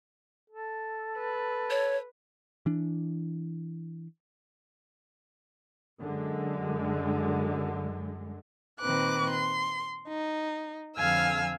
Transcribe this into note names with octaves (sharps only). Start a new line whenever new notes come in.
A4
B4
C#5
E3 D4
F#2 D3 G#3
A#2 D#3 C4 B4 D6 F#6
C6
D#4
F2 D3 F5 G#5 E6 F6